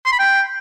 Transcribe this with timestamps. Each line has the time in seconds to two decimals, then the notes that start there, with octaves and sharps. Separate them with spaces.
0.06 C6
0.12 B5
0.19 G5